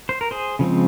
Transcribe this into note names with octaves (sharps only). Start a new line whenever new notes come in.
C5
A#4
G#4 C5
C#3 F3 G#3 C4